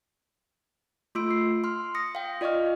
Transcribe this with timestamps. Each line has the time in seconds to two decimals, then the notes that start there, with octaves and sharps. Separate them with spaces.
1.15 A3 F4 C6 E6 D7
1.31 C7
1.64 C6 F6
1.95 D#6 A#6 C#7
2.15 F5 G5
2.41 F4 D5 D#5 C#6 F6